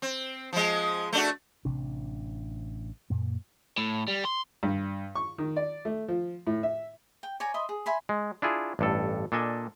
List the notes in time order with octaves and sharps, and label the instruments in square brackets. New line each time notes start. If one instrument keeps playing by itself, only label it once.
[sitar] C4
F3 G#3
A3 D4 F#4
[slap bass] A1 C3 C4 D4
F#2 A#2 A#3
[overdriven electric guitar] A2
G3
C6
[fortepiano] G2
C#6
D#3
D5
A3
F3
A2
E5
[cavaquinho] G5
C#5 D5 G#5 A#5
D#5 E5 B5 C6
G#4
E5 G#5 B5 C6
[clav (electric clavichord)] G#3
D4 E4 F4 G#4
A1 G2 A4
A#2 D4 A4 D#5 G#5